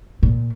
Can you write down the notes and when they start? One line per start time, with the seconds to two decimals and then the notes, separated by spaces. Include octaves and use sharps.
0.23 A#2